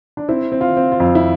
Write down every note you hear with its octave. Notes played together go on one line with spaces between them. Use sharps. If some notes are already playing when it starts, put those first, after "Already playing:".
D4
C4 E4
C4
F4
C4
F4
F2
E4